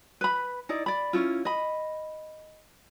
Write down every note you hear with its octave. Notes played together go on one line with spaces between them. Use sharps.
B4 B5
D#4 E4 D5
D5 B5
C#4 E4 F4
D#5 B5